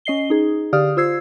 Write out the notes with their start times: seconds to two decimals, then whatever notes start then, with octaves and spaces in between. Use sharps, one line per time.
0.05 C#4 D#5 C7 G7
0.30 D#4 G#4
0.73 D3 G4 D5 F5 D#6 F6
0.97 F4 C5 E6 G#6 C7